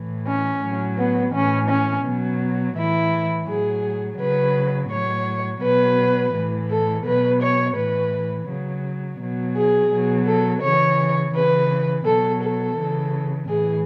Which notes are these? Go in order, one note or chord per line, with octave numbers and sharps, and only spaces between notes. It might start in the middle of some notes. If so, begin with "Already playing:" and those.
Already playing: A2 E3
C#4
A2 F#3
B3
A2 E3 C#4
C#4
B2 F#3
A2 E3 E4
A2 F#3 G#4
C#3 F#3 B4
A2 F#3 C#5
B2 F#3 B4
A2 E3
A4
B2 F#3 B4
C#5
A2 E3 B4
C#3 F#3
B2 F#3
G#4
B2 F#3
A4
C#3 E3 C#5
C#3 E3 B4
B2 F#3 A4
A4
C#3 E3
A2 E3 G#4